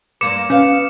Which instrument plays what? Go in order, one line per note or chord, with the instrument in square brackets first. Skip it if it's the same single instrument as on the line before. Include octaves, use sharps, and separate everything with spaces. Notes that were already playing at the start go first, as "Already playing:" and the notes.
[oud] G2 A#3 C5 [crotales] D6 C#7 E7
[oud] B3 F5 [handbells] C#4